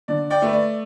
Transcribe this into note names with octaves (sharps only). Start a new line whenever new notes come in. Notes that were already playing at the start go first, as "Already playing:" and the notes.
D3 D5
D5 G5
A3 B4
D5